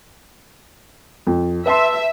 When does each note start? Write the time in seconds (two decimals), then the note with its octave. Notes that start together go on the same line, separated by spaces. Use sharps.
1.27 F2
1.66 B4 E5 A5 C6